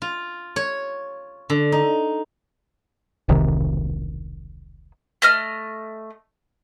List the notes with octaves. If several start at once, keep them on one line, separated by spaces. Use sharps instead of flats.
F4
C#5
D3
D#4
E1 C2 C3 D#3
A3 D#5 F6